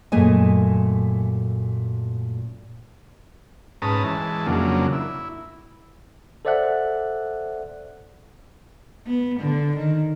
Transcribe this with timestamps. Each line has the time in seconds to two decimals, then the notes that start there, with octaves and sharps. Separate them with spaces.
0.12 F#2 A#2 A3 G#4 D#5 G#5
3.82 G#2 C#4 B4 A5 A#5 D#6
4.04 E3 G#3 A5
4.47 F2 C#3 F#3 A#3 D4
4.93 E4
6.45 A4 C5 D5 E5 F#5 F#6
9.06 B3
9.40 D3
9.76 D#3